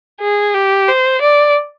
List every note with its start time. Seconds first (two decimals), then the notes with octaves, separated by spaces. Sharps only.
0.21 G#4
0.54 G4
0.88 C5
1.22 D5